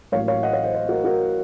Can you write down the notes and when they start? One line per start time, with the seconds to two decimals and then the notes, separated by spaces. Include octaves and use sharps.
0.12 A1 A2 F#3 A#3 C#5 F5
0.28 C#5 F5
0.43 D#5 F#5
0.53 C#5 F5
0.64 C5 D#5
0.74 C5 D#5
0.89 F#4 A#4
1.04 F#4 A#4